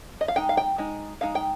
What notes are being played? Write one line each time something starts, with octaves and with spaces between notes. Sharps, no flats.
D#5
F5
G#3 D#4 G5
F5
G5
G#3 D#4
G#3 D#4 F5
G5